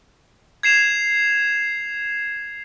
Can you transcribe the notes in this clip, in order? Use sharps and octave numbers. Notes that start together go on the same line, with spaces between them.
G#6 C7 E7 F7